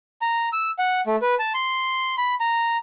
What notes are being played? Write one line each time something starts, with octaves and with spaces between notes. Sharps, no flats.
A#5
E6
F#5
A3
B4
A5
C6
B5
A#5